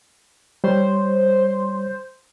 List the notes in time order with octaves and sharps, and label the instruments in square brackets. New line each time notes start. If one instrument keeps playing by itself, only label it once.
[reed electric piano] G3 C#5 [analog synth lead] C5